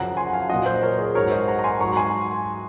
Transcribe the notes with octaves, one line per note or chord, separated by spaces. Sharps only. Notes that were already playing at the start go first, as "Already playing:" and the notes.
Already playing: F#2 C#3 F3 F#5 A#5
G#5 C6
F#5
F5 G#5
A#2 F#3 D#5 F#5
C5 D#5
A#4 C#5
G#4 C5
G#2 F#3 A#4 C#5
C5 D#5
F#5 A#5
A#5
G#5 C6
G#2 F#3 A#5 C#6
G#5 C6